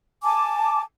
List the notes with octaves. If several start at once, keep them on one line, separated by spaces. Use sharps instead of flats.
G#5 A5 D6